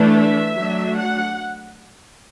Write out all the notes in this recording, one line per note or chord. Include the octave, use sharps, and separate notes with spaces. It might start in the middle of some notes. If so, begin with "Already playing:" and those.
Already playing: E3 A3 D4
E5
F#3 A3 D4
F#5